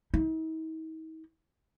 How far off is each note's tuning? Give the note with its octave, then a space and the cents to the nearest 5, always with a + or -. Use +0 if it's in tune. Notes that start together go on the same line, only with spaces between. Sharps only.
D#4 +45